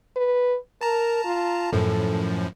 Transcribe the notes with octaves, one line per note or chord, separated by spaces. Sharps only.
B4
A#4 A5 A#5
F4
F#2 A2 F3 A4